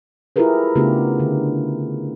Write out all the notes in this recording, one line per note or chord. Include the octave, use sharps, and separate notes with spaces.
E4 F4 G4 G#4 A#4 B4
C#3 A3 B3 D4 F4 G4
D3